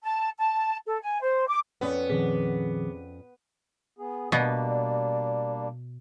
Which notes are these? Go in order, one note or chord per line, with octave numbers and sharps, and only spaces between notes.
A5
A5
A4
G#5
C5
D6
F2 B3 C#4 D5
A#2 D#3 F3 C4 G#4 B6
B3 G#4
B2 G3 A#3 B3 D4 D5